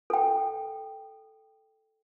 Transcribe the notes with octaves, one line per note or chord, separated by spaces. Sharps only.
A4 G5